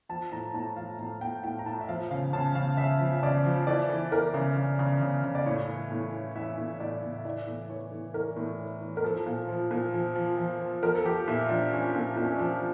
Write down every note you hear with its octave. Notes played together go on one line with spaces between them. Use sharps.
F3 A5
A2 A#5
A2 A5
F3 F5
A2 A5
A2 G5
A2 G5
A#5
A2 A5
E5
F3 F5
C#3 F5
C#3 A5
C#3 F5
C#3 E5
F3
C#3 D5
F3
E3 D5
E3
E3 A#4
C#3
C#3
C#3
C#3
C#3
D5
A2 C#5
E3
A2
E3
E3 E5
A2
A2 D5
A2
E5
E3 D5
A2
E3 C#5
E3
E3 A#4
A2
E3
E3
A#4
F3 A4
A#2
F3
A#2
F3
F3
F3
F3
F3 A#4
A4
F3 G4
A#2 E4
F3 D4
F3 C#4
A#2
A#2 D4
C#4
D4
F3